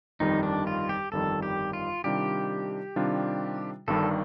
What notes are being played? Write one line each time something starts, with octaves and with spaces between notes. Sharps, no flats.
G1 F2 D#3 G3 D#4
D4
F4
G4
G1 F2 D#3 G3 A4
G4
F4
C3 D#3 G3 D4 F4 G4
C3 D#3 G3 D4 F4
G1 G2 D#3 G3 A4